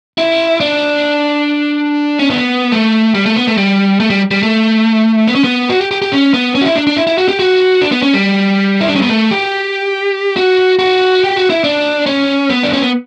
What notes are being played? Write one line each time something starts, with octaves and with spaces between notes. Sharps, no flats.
E4
D4
C#4
B3
A3
G3
A3
B3
A3
G3
A3
G3
G3
A3
B3
C#4
B3
F#4
G4
G4
G4
C#4
B3
C#4
F#4
E4
D4
D4
E4
E4
F#4
G4
F#4
D4
B3
C#4
G3
E4
D4
C#4
B3
A3
G4
F#4
F#4
G4
F#4
E4
D4
C#4
B3
D4
C#4
B3